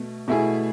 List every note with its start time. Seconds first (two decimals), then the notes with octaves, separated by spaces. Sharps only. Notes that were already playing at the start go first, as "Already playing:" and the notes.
Already playing: B2 A3
0.28 B2 A3 E4 G#4